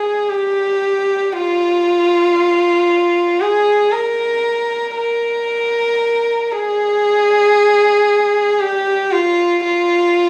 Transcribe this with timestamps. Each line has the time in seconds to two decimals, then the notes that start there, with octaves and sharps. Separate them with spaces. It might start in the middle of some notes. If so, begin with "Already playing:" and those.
Already playing: G#4
0.29 G4
1.33 F4
3.41 G#4
3.92 A#4
4.96 A#4
6.52 G#4
8.60 G4
9.11 F4
9.64 F4